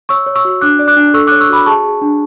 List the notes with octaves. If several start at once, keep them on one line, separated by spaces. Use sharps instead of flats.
C#5 C#6 E6
C#5
C#6 E6
F#4
D4 D6 F#6
D5
D6 F#6
D4
A4 C#6 E6
C#5 D6 F#6
C#6 E6
F#4 B5 D6
G#4 A5 C#6
G#4
D4